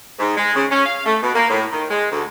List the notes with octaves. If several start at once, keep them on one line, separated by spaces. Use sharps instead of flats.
G#2
G#3
C#3
C#4
F5
A3
B2
A#3
A2
D#3
G#3
D2